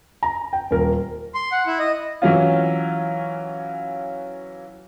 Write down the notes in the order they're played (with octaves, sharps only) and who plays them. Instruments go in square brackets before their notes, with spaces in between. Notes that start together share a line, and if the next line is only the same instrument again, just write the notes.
[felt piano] A#5
G5
D#1 A#4
[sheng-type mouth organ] C6
F#5
E4
D#5
[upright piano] E3 F#3 C#4 F4